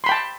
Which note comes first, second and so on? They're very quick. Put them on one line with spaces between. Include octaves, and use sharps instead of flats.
C6 B5 G5 A5